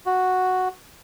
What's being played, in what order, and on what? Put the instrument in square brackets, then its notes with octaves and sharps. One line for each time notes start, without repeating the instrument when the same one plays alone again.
[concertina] F#4